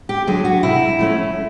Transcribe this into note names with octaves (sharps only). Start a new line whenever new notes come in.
G4
D3 F#3 G#4
F#4
C3 E4
F3 A3 C#4